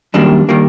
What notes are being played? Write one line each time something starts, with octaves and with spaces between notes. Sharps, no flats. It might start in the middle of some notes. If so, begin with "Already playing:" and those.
F#2 D#3 G3 A#3 D4
D#3 G3 A#3